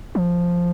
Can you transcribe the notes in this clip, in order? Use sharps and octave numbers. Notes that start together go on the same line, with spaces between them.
F3